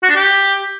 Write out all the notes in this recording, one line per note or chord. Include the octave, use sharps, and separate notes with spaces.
F#4
D4
G4